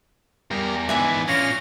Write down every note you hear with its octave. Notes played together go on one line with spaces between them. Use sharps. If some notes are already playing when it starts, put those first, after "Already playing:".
E2 G3 A#4
G#2 E3 B3 D4 E5 G#5 F#6
A#2 C#4 F5 A#6